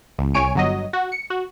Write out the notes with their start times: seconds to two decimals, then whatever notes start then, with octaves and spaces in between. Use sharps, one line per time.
0.19 C#2
0.34 C2 C#5 G#5 D7
0.55 G1 F#3 D#5
0.93 F#4
1.12 C#7
1.30 F#4